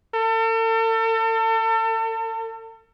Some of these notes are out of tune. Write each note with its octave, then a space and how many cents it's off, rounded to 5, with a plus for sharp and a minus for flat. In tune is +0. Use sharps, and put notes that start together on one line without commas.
A4 +40